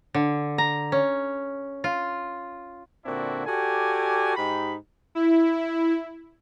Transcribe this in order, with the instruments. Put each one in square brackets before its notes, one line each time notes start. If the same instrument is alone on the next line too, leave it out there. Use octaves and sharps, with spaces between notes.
[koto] D3
A#5
C#4
F4
[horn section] A#2 D3 C4 D4 E4 F#4
F#4 G4 A4 D5 G#5
G#2 D#4 G4 B5
[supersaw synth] E4